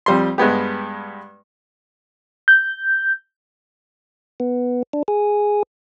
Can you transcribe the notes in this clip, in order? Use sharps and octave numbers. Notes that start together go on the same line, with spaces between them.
F2 G3 C6
G2 G#3 B3 G4
G6
B3
D4
G#4